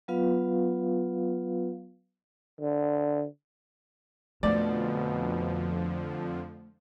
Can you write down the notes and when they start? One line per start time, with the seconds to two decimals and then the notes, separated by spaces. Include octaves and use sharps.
0.08 F#3 B3 F4 B4 F5
2.61 D3
4.43 F2 B2 D3 F3 A3 D5